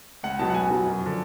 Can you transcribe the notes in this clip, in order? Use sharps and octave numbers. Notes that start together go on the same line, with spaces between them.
C#2 F#5
B2 F#3 A5
F#5
C#2 G#5
B2 F#3
F#2
D3 F3